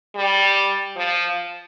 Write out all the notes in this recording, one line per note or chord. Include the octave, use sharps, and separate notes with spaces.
G3
F3